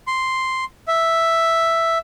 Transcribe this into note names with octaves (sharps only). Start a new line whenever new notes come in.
C6
E5